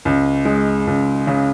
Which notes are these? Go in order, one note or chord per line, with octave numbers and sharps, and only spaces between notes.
C#2
G#3
C#2
C#3